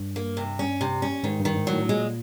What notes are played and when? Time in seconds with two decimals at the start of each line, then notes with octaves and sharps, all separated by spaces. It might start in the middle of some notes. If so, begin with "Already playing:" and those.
Already playing: G2
0.16 A#3
0.37 C3
0.59 C#4
0.81 C3
1.02 C#4
1.23 G#2 D#3
1.40 G2
1.45 D#3
1.56 G#2
1.67 F#3
1.72 A2
1.89 A#2 G#3